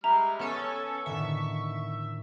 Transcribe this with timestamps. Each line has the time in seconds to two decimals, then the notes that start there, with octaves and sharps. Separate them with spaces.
0.04 G3 G#3 E5 A#5 B5 F6
0.39 B3 C#4 A4 C#6
1.06 A2 D3 D#3 E5